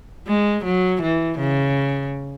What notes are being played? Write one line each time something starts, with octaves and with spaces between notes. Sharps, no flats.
G#3
F#3
E3
C#3